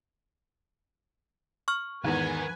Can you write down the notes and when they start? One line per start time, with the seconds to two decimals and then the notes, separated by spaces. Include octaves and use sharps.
1.68 C#6 F6
2.04 E2 G#2 D#3 A#4 B4 G#5